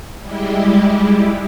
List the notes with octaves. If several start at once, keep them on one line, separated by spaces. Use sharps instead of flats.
G3 G#3 E4 G4